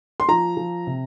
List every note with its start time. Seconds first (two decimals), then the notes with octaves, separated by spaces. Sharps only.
0.20 C6
0.28 F3 A#5
0.57 F3
0.87 C3